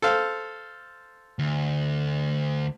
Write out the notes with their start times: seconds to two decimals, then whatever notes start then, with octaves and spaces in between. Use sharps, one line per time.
0.02 A4 C5 F5
1.39 D2